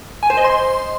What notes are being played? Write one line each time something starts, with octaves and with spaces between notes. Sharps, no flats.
G#5
C5
D#5
C6